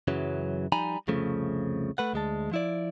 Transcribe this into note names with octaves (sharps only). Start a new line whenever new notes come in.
F#2 C#3 E3 F#3
F3 G3 D#4 G#5 A#5 B5
C2 F2 C#3 F3 A3
A3 B4 F#5
D2 G#3 A5
F3 E4 D5